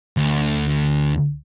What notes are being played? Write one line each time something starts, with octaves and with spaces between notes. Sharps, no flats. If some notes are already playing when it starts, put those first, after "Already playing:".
D2